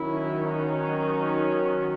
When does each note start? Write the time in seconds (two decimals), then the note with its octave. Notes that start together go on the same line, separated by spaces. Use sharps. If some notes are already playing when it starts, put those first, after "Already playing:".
Already playing: D#3 F#3 C#4 E4
0.50 D#4